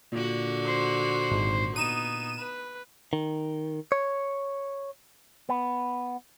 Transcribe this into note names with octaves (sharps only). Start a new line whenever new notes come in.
A#2 D3 F#4
C5
G#1
B3 D#4 D#7 E7
B4
D#3
C#5
B3